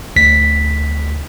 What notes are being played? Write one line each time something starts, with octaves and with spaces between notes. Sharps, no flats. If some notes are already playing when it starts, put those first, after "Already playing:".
D2 B6